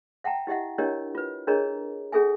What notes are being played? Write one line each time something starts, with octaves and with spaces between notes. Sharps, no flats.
E5 F#5 G5 A5 A#5
E4 G4 D#5 E5 F#5
D4 E4 G4 A#4 C#5 D#5
F4 B4
D4 G#4 A#4 C#5 D#5 A#5
C#4 G#4 A4 E5 G#5